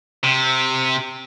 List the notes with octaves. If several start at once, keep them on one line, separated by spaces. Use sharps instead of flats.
C3